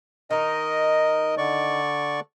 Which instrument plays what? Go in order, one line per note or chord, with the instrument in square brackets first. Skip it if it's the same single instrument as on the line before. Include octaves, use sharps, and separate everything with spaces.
[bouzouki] D#3 D#4 [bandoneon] A#4 D#5
[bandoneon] D3 D5 C#6